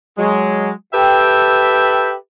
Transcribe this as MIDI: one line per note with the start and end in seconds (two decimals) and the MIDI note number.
0.17 0.70 54
0.17 0.70 56
0.93 2.13 67
0.93 2.13 69
0.93 2.13 71
0.93 2.13 76
0.93 2.13 79